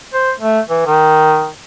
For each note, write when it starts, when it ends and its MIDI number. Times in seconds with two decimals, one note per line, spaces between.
0.14 0.32 72
0.40 0.60 57
0.69 0.82 52
0.86 1.49 51